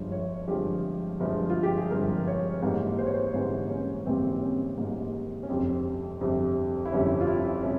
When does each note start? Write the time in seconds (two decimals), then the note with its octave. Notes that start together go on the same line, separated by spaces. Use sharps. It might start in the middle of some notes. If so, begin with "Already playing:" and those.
Already playing: G1 G2 F3 G#3 C#5
0.12 C#5
0.48 G1 G2 F3 G#3 G4
1.20 G1 G2 F3 G#3
1.50 F4
1.63 G4
1.77 G#4
1.91 G1 G2 F3 G#3 A#4
2.28 C#5
2.63 G#1 G#2 E3 G3 A#3
2.98 C5
3.06 C#5
3.14 C5
3.34 G#1 G#2 E3 G3 A#3 C5
3.70 C#4
4.06 G#1 G#2 E3 G3 A#3 C4
4.34 C4
4.41 C#4
4.78 G#1 G#2 E3 G3 A#3
5.43 C#4
5.49 G1 F2 C3 G3 C4
6.20 G1 F2 C3 G3
6.85 E4
6.92 G1 F2 C3 G3 C#4
7.21 F4
7.27 E4
7.63 C3 G3 C#4